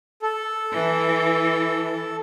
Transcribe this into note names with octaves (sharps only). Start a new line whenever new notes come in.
A4
E3